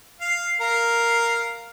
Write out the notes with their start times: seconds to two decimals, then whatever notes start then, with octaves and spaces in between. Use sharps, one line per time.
0.20 F5
0.61 A#4 F5